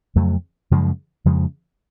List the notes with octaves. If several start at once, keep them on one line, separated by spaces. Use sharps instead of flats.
F2 C#3 F#3 A3
F#2 C#3 F3 G#3
F2 C#3 F3 G#3